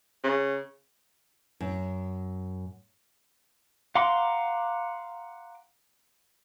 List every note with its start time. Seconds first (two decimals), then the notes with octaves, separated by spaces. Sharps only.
0.24 C#3
1.61 F#2
3.95 F5 F#5 A#5 C6 D6